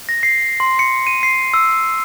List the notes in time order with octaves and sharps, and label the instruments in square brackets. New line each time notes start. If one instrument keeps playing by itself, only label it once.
[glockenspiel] A#6
C7
C6
C#7
D#7
C7
E6